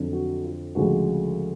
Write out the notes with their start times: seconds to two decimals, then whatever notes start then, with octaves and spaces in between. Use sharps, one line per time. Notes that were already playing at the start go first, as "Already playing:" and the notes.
Already playing: F2 D3 F#3
0.13 F#4
0.44 F4
0.75 D2 C#3 F3 G#3 F#4